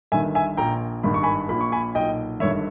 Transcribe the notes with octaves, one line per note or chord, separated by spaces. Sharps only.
G1 G2 D#3 E5 G#5
E5 G#5
A#1 A#2 G5 A#5
G#1 G2 D#3 B5
C#6
G#5 B5
A#1 A#2 B5
C#6
G#5 B5
B1 A#2 D#5 G5
G1 G2 D#3 C#5 E5